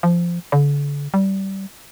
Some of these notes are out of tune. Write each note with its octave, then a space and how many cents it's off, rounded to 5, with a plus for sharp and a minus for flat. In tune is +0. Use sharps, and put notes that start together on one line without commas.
F3 -15
D3 -40
G3 -20